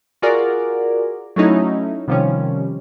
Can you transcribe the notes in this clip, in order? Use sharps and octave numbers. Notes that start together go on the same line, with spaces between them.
F4 F#4 G#4 A#4 D5
F#3 A3 C#4 D#4 E4
C3 D#3 F3 G3 C#4